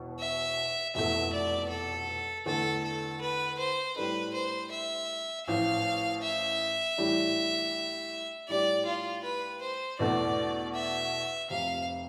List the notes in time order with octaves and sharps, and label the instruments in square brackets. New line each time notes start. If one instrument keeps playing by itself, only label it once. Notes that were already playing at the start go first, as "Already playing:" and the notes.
Already playing: [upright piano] E1 E2 B2
[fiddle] E5
[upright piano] F1 E2 B2 A3 [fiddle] E5
[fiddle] D5
A4
[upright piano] E2 D3 A3 [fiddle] A4
[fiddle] A4
B4
C5
[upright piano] A2 G3 D4 A4 [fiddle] B4
[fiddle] C5
E5
[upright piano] A1 A2 F3 [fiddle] F5
[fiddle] E5
[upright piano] A2 E3 G3 D4
[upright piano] A2 G3 D4 G4 [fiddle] D5
[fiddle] F4
B4
C5
[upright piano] E2 B2 A3 D4 [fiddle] D5
[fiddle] E5
[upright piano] F1 F2 C3 [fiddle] F5